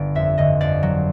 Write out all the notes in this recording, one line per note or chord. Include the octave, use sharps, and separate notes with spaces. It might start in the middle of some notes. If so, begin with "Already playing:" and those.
Already playing: G1 D5
F2 E5
G1 D#5
F2 D5
F#3